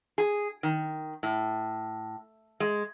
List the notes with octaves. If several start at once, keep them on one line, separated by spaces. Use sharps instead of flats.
G#4
D#3
A2
G#3